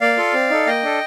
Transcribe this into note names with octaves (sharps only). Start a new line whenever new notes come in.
A#3 D5 F5
F4 A4
C4
D#4 A4
A#3 D#5 G5
D4 A4